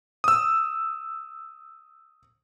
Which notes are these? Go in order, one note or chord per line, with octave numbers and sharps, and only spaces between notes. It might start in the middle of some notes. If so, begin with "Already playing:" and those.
D#6 E6